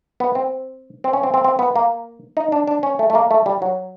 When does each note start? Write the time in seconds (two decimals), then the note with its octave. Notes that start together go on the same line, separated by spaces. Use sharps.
0.20 B3
0.35 C4
1.04 C4
1.13 C#4
1.23 C4
1.34 C4
1.44 C4
1.59 B3
1.76 A#3
2.37 D#4
2.52 D4
2.67 D4
2.83 C#4
2.99 A3
3.10 A3
3.15 A#3
3.31 A3
3.46 G3
3.62 F#3